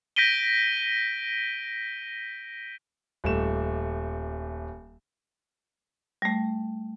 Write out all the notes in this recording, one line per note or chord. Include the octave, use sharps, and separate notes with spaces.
G6 A#6 B6 D7 D#7 G7
D#1 A3 E7
G3 A3